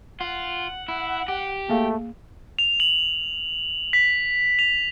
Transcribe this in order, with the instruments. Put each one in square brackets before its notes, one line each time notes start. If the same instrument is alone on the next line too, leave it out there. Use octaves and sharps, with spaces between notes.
[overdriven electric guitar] F4 [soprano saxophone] F#5
[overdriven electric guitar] E4
G4
[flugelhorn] A3 [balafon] A#3 G#4 F5
[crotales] F7
F#7
B6
F7